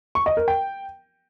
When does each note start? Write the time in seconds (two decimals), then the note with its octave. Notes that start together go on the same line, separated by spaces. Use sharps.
0.15 C#6
0.26 D#5
0.37 A#4
0.48 G5